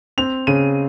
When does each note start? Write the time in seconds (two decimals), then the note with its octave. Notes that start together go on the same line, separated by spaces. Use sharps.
0.18 C4 F7
0.47 C#3 D#7